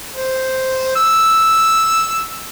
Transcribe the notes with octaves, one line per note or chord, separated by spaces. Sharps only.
C5
E6